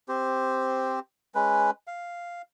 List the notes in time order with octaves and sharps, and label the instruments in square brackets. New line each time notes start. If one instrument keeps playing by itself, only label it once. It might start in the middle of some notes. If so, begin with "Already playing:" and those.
[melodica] C4 G4 C5
G#3 C#4 B4
F5